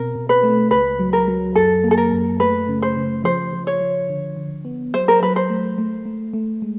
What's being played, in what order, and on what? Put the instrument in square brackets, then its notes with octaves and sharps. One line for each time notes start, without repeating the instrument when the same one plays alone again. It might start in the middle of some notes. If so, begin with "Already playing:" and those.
Already playing: [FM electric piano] B2 C4 [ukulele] A#4
[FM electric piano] B2
[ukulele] B4
[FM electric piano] A3
[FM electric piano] C#2 [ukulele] B4
[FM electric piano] F#3
[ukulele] A#4
[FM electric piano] F#3
[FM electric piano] F#2 [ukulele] A4
[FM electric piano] A#3
[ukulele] A4
A#4
[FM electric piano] F#2
[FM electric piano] A3 [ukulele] B4
[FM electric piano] C#3
[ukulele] C5
[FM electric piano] C#3
[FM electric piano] F3 [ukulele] C5
[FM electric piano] F3
[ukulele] C#5
[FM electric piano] F3
D3
D3
B3
[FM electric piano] F#3 [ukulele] C5
[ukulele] A#4
[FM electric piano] F#3 [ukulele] B4
[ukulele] C5
[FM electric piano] A3
A3
A3
A3
G#3